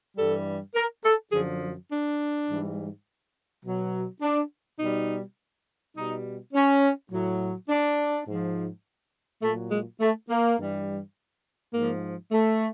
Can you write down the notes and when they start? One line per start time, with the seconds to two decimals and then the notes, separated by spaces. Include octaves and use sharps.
0.16 G2 E3 G3 A4
0.75 A#4
1.04 A4
1.32 F#2 D3 F3 G#4
1.91 D4
2.48 G#2 E3 G3
3.64 B2 F#3
4.22 D4
4.79 B2 G3 D#4
5.95 B2 G3 D#4
6.53 C#4
7.11 A2 F#3
7.69 D4
8.26 G#2 F3
9.42 A#2 F#3 A3
9.71 G#3
10.00 A3
10.29 A#3
10.58 G2 E3 G3
11.74 G#2 F3 A#3
12.32 A3